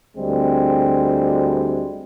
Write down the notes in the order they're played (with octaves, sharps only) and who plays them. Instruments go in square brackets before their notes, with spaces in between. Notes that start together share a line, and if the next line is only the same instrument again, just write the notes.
[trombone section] D2 G3 G#3 C4